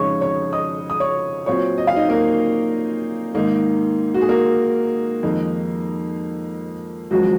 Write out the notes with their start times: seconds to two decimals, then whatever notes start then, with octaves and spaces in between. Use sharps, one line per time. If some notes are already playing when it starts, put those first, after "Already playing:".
Already playing: F2 C#3 G#3 D#4 G#4 C#5 C#6
0.21 C#5 C#6
0.53 D#5 D#6
0.90 D#6
1.00 C#5 C#6
1.46 A#2 F#3 C4 F4 C#5 C#6
1.78 D#5
1.87 F5
1.96 D#4 D#5
2.09 A#3 A#4
3.34 G#2 D#3 A#3 D#4
4.14 F#4
4.22 G#4
4.29 A#3 A#4
5.23 F2 D#3 G#3 D#4
7.11 G#1 F#2 F3 G#3 F#4